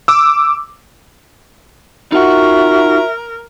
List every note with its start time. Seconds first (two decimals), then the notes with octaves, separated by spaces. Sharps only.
0.08 D6 E6
2.12 D#4 F4 F#4 A#4 E5 F#5